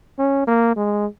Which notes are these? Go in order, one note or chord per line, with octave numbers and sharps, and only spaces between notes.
C#4
A#3
G#3